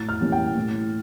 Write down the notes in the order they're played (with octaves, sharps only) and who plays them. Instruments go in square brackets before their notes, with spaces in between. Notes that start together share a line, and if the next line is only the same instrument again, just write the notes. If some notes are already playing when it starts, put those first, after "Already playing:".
Already playing: [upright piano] A2 A6
F6
E3 G3 A#3 C#4
G5
A2